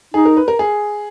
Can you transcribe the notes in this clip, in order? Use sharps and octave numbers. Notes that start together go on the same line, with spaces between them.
D#4 G#4
A#4
B4
A#4
G#4